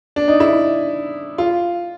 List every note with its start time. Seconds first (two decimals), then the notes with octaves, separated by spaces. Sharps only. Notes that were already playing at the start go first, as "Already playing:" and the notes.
0.16 D4
0.28 D#4
0.40 E4
1.38 F4